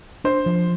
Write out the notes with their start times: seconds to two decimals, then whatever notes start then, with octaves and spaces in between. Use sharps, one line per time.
0.24 D4 C5
0.46 F3